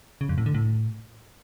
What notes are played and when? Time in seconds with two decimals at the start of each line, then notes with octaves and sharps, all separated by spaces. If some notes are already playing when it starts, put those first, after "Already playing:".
0.21 C#3
0.29 F2
0.38 A2
0.46 D3
0.55 A2